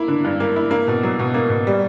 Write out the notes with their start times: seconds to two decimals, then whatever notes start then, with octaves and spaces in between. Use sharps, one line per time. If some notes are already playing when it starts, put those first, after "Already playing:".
Already playing: A#3 E4
0.08 D3
0.24 G2
0.40 A#3
0.56 E4
0.71 A#3
0.88 B2
1.03 F#3
1.19 B2
1.34 A#3
1.50 B2
1.67 G3